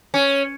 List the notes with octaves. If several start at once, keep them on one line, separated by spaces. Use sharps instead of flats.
C#4